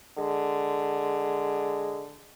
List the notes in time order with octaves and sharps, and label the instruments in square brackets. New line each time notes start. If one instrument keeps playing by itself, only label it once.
[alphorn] D3 [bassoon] G#3